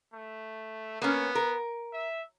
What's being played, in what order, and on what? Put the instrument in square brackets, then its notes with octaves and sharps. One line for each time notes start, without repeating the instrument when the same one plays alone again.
[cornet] A3
[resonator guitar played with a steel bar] A#3 C#4 [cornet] B3
[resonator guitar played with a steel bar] A#4
[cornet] E5